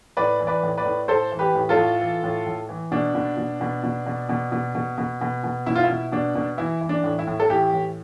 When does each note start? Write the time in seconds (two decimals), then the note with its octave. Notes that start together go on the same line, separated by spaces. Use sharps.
0.17 A2 B4 D5
0.40 E3
0.47 B4 D5
0.63 A2
0.77 B4 D5
0.85 A2
1.08 A2 A4 C5
1.32 E3
1.39 G4 B4
1.55 A2
1.69 F4 A4
1.77 A2
2.00 E3
2.23 A2
2.46 A2
2.69 E3
2.92 B2 D4
3.15 B2
3.37 B2
3.61 B2
3.84 B2
4.06 B2
4.29 B2
4.52 B2
4.75 B2
4.98 B2
5.21 B2
5.44 B2
5.66 B2 E4
5.76 F4
5.84 E4
5.89 B2
6.12 B2 D4
6.35 B2
6.58 E3 E4
6.81 E3
6.89 D4
7.04 A2
7.19 E4
7.27 A2
7.40 A4
7.50 E3 E4 G4
7.73 A2